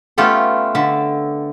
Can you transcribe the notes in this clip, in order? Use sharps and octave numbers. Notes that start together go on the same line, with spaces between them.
A3 B3 C#4 F4 G4 A4
D3 E5 A5